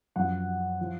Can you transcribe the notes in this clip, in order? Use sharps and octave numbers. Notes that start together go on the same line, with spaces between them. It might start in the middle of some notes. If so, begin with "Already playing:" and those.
F#2 F3 F#5
F3